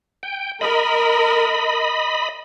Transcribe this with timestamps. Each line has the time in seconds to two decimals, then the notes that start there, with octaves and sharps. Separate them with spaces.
0.23 G5
0.61 A#4 D#5 B5